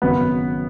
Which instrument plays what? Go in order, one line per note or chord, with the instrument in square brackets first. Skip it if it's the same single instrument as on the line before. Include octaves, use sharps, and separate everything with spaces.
[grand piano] G#1 F#2 C#3 B3